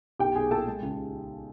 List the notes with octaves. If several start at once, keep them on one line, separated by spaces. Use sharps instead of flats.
B1 G4 G5
B1 G#4 G#5
A#2 A4 A5
G#3
C#2